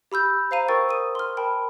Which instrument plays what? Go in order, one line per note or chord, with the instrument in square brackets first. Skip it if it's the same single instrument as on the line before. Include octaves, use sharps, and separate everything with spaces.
[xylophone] G4 B5 E6 G6
C5 F5 A#5 D#7
A#4 C5 G5 C#6 E6 A6
D#6 D#7
C6 F6
A#4 G5 A5 B5